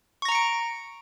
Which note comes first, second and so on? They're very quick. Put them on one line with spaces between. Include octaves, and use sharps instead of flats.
C#6 A#6 A#5 C#7 D7